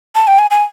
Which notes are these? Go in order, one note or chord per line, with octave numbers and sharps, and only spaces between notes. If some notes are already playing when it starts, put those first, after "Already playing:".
A5
G5
G#5
G#5